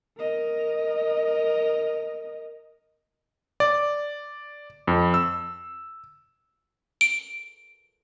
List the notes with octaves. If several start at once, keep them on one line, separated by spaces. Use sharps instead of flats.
A#4 D#5
D5
F2
E6
D7